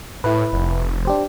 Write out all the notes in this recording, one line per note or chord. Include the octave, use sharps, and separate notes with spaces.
A2 E4 B4
F1
D4 G4 C5